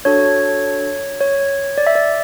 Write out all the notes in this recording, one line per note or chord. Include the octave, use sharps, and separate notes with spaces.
D4 F#4 A4 C#5
C#5
D5
E5
D5